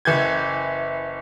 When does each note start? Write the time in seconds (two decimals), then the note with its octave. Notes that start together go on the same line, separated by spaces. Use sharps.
0.05 F#1 E3 G6 G#6